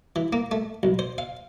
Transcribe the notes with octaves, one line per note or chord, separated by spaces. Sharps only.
E3
A#3
A3
B1
C5
F5